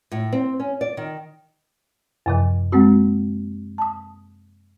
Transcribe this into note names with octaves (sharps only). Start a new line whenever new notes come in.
A2
C4
C#4
D5
D#3
F#2 C3 F3
G#3 A#3 C4 F#4
A5 D#6